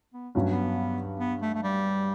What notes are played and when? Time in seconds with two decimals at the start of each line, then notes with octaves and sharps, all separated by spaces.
0.14 B3
0.35 G2 F#3 B3 C#4
0.43 A3
0.52 B3
1.20 B3
1.42 A3
1.54 A3
1.63 G3